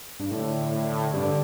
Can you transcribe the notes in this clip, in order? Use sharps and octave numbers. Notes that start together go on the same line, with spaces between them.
G2
A2 D3
G2 D3